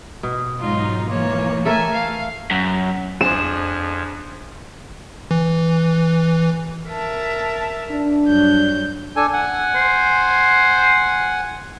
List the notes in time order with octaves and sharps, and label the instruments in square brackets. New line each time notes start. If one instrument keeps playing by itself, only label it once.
[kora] B2
[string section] G#2 F#3 D#4 [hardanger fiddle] F4
[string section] E3 A#3 [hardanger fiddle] C#5
[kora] A3 A4 A#4 [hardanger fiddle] E5 G#5
[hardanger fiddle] F5
[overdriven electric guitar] F#2
[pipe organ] F2 [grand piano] D4 G#4 C5 [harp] E7
[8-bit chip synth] E3
[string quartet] A#4 E5 A5
[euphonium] D4
[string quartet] G2 F#3 G6
[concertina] D4 A4 G#5
F#5 G#5
[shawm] C5